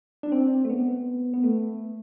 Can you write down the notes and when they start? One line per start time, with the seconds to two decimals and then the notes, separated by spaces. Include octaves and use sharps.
0.23 D4
0.32 C4
0.65 A3
0.70 B3
1.34 B3
1.43 A3